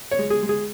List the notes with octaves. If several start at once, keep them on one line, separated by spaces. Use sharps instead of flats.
C#5
G#3
G#4
G#3
G#4